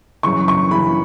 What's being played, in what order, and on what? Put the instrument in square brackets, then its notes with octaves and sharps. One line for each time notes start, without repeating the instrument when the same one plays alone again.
[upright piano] F#2 C#3 E3 C#6
C#6
F#2 C#3 E3 B5